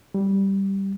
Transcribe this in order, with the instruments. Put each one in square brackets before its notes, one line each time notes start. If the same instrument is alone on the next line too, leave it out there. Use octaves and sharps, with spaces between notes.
[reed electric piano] G3